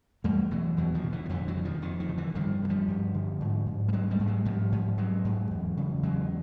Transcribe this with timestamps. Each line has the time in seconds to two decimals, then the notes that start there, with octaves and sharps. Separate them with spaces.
0.24 E2 G3 A3
0.51 B2 E3 F#3
0.77 E2 E3 F#3
0.94 D#3 F3
1.03 B2
1.12 D3 E3
1.25 F3
1.29 F2 D3 E3
1.48 E3 F#3
1.57 C#3
1.65 D#3 F3
1.82 F2 D#3
2.00 D#3
2.09 C#3
2.17 D3 E3
2.35 G2 D#3 F3
2.62 D3
2.70 F3 G3
2.88 G2
3.14 D3
3.40 G#2
3.66 G#2
3.88 G3
3.93 G#2 F#3 G#3
4.10 G3 A3
4.19 G#2
4.27 F#3 G#3
4.45 G#2 F3 G3
4.72 G#2
4.98 G#2 F#3 G#3
5.25 G#2
5.51 E2
5.77 C#3
6.03 E2 F#3 G#3